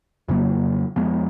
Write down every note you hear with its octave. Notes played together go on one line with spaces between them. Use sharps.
F2 C#3 F#3 A#3
F2 F3 G#3 B3